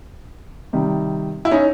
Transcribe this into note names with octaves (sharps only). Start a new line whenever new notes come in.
C3 D#3 G3
E4
C#4 D#4